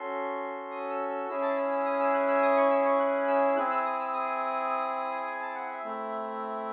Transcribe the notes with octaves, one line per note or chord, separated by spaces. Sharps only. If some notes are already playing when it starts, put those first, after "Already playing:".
Already playing: C#4 F#4 A4 C6
D#6
E6
E6
C#4 E4 G#4 E6
A5
E6
E6
D#6
E6
F#6
E6
D#6
C#6
E6
C#6
F#6
E6
C4 E4 G#4 F#6
E6
D#6
E6
D#6
G#5
A5
F#5
E5
A3 C4 E4